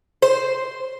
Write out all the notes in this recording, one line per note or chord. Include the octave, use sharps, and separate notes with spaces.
C5